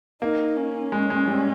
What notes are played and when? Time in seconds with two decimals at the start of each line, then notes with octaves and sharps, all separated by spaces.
0.22 A#3 D#4
0.56 C#4
0.92 G#3
1.10 G#3
1.28 G3